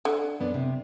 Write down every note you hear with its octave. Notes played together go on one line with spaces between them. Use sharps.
D3
F#2 B3 D4
C3